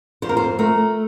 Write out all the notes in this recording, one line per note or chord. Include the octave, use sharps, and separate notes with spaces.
F2 C5
A#4
C5
A3 A#4